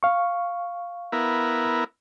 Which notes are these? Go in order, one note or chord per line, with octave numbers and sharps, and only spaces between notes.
F5 C#6
B3 E4 A#4